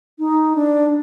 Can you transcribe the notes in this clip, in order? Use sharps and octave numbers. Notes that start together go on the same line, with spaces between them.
D#4
D4